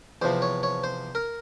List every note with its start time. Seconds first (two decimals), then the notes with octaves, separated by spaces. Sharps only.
0.22 E2 C3 F3 C5
0.42 C#5
0.63 C#5
0.84 C5
1.15 A#4